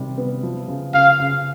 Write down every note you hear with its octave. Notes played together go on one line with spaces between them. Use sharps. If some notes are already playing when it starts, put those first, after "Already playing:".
Already playing: C3 D#3 G3
B3
F3
C#3
C#3 F5
C#3